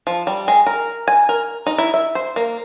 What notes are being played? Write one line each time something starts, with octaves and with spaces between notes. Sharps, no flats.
F3
G3
G#3
A#4
G#5
A#4
D#4
E4
E5
C5
A#3